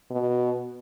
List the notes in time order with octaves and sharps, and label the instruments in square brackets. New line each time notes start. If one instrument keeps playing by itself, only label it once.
[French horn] B2